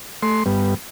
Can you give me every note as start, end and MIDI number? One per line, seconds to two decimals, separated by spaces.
0.23 0.44 57
0.23 0.44 84
0.46 0.74 43
0.46 0.74 55
0.46 0.74 59